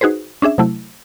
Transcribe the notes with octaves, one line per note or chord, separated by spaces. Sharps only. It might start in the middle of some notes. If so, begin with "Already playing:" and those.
D#4 F#4 G#4 B4 C5
C#4 D4 G#4 E5
C3 F#3 A3 E4